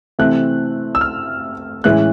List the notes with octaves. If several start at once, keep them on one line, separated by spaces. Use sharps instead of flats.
C3 E3 A3 C4 F#6
E6
F6
A2 E3 G#3 C#4 E4 F#6